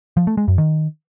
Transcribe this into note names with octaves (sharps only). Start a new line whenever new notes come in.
F3
A3
G#3
F#2
D#3